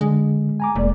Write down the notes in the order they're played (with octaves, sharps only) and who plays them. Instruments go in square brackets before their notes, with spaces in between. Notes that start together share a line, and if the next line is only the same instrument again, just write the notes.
[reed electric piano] D3 [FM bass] G#3
[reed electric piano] G#5 A#5 D6
[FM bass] E1 [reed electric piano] G#3 A#3 D5